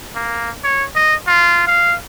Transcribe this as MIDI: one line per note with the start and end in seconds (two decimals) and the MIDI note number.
0.15 0.51 58
0.64 0.84 73
0.95 1.15 75
1.27 1.65 65
1.67 1.97 77